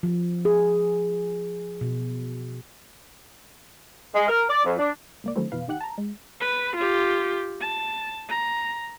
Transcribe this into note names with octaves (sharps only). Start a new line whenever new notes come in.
F3
G#4
B2
G#3
A#4
D5
F2
D4
C#2 A#3 D5
D3 D#3 F#3 A3 C4 E4
F2 B2 E3 B4 F5
D#2 D#3 G4 F#5 F#6
A5 A#5
G#3
B4
F4 G4
A5
A#5